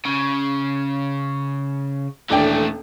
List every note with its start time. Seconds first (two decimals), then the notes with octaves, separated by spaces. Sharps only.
0.05 C#3
2.30 D#1 E3 A3 D4 G5